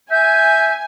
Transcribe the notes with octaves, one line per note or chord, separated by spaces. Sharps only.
E5 G#5 G6